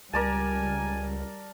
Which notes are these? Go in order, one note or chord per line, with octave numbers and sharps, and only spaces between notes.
C#2 G3 A#4 D5 G#5 A5